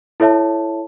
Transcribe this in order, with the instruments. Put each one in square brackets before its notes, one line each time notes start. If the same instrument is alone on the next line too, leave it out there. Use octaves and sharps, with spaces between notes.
[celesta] E4 A4 C#5 E5 A5